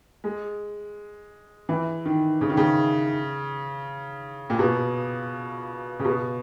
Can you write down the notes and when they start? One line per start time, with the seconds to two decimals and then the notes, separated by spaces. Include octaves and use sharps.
0.24 G#3
1.69 E3
2.05 D#3
2.41 C#3
2.49 D#3
2.57 C#3
4.50 A#2
4.59 B2
6.00 C#3
6.05 B2